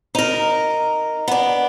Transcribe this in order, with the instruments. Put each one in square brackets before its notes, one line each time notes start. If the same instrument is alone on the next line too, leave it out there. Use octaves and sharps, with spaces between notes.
[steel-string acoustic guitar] D#4 A#4
B3 D4